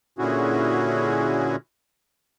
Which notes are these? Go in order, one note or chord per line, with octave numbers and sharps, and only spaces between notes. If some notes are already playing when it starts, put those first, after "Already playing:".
A#2 D3 C#4 E4 F#4 G#4